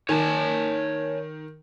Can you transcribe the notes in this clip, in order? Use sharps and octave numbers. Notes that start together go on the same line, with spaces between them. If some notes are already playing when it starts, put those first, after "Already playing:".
D#3 C#5 G#5 A5